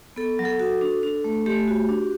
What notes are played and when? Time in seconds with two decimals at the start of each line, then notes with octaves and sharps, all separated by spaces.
0.16 B3 A4
0.39 F#3
0.45 A4
0.60 F#4
0.81 D4
1.03 D4
1.24 A3
1.46 A3 G4
1.68 F#4
1.89 D4